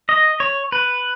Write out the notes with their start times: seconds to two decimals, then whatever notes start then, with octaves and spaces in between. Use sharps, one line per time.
0.09 D#5
0.40 C#5
0.72 B4